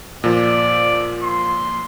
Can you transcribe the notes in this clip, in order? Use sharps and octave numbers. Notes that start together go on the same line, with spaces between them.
A#2 F3 D5
C6